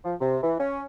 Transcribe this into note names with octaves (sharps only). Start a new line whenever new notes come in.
F3
C3
E3
C#4